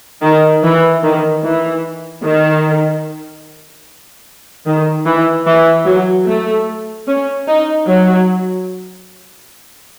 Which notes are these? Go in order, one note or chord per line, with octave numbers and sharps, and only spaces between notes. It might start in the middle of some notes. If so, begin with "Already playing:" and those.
D#3
E3
D#3
E3
D#3
D#3
E3
E3
F#3
A3
C#4
D#4
F#3